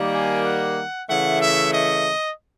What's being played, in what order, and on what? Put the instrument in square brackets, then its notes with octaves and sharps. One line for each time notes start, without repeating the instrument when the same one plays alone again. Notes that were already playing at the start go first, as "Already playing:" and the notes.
Already playing: [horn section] D#3 G3 A#3
G#5
F#5
C#3 E3 A3 F#5
E5
D#5